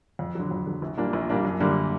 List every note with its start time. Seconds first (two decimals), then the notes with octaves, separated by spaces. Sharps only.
0.19 F2
0.35 D3 F#3
0.51 F2
0.66 D3 F#3
0.82 A#1
0.97 A#2 G3 A#3 D4
1.13 A#1
1.29 A#2 G3 A#3 D4
1.45 F#2
1.60 D3 G3 A#3